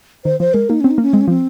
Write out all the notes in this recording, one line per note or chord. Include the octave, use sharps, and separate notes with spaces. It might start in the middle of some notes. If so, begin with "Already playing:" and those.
D#3 C5
F3 C5
G#3 A#4
A#3 D#4
C4 C#4
D#4
A#3 C#4
G#3 C4
C#4
F3 C4